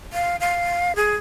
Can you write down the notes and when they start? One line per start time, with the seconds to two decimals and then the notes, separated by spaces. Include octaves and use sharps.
0.13 F5
0.40 F5
0.96 G#4